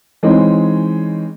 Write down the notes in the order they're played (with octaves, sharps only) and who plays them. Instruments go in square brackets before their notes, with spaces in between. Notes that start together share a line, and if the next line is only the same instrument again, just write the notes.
[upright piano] E3 G#3 C4 C#4 D#4